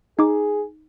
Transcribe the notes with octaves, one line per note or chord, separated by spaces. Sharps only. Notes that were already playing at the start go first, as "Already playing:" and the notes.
D#4 G#4 D6